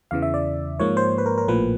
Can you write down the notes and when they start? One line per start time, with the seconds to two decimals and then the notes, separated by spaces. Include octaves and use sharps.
0.11 E2 C#3 E3 F5
0.22 E5
0.34 D5
0.79 G#2 F3 A#3 C#5
0.97 C5
1.18 B4
1.26 A#4
1.38 A#4
1.48 A#1 A2 F3 A#3 B4